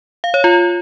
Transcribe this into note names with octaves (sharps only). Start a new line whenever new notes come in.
F5
C#5
F4